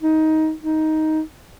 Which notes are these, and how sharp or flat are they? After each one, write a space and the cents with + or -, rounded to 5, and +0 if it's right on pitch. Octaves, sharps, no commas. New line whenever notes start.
D#4 +15
D#4 +10